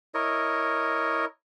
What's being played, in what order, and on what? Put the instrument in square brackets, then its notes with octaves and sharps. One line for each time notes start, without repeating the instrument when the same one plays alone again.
[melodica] E4 A#4 C#5 D#5